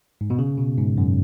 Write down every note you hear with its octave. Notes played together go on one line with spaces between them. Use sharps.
G#2
B2
C#3
B2
G#2
F#2